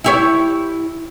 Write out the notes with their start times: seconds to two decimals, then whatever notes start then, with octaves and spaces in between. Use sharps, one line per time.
0.04 E4 G4 C#5